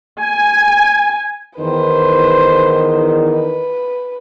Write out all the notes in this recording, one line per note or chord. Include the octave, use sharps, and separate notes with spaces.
G#5
E2 D#3 B4 C5
B4